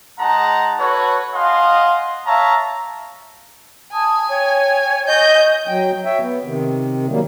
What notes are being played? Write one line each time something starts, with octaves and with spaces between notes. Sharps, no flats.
G#3 D#4 F#5 A5 A#5
F#4 A4 B4 C#5
D#5 F5 F#5 G#5 C6
C#5 E5 F5 A5 A#5
G#5 A5 D#6
C#5 G5
D#5 G#5 C#6 G6
F#3 G5
C#5 E5 G5
B3
C3 D#3
F#3 G3 A#3